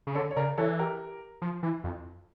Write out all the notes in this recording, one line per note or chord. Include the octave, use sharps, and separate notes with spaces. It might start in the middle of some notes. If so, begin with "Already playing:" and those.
C#3
D3 A4 C#5
C#5
C#3 A#4 D5
E3 A4 C#5
G4 A#4
F3
E3
F2